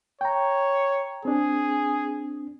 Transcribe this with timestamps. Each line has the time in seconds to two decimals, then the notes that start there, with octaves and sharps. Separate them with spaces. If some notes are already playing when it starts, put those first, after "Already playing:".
0.21 C#5 G5 A#5
1.25 C4 D4 G#4